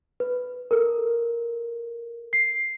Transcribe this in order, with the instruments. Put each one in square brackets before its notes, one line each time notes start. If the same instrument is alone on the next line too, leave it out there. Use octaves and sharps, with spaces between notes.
[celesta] B4
A4 A#4
C7